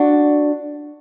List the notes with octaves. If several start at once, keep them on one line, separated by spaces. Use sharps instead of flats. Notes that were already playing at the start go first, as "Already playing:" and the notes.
Already playing: D4 F#4